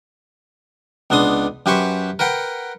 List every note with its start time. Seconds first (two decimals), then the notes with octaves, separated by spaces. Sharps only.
1.10 C#2 B3 D4 C6 D#6
1.66 F#2 G4 B4 C5 C#6
2.19 A#4 B4 F#5 G5